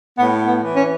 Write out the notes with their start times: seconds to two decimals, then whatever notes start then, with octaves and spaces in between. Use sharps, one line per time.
0.18 A2 B3
0.47 B3
0.62 E3
0.77 C#4